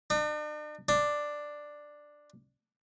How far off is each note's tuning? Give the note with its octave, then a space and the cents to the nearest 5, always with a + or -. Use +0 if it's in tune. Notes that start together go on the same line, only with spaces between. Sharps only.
D4 +45
D4 +5